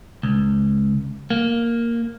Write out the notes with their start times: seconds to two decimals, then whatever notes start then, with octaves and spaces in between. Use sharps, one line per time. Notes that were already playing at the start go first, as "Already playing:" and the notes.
0.23 C#2
1.30 A#3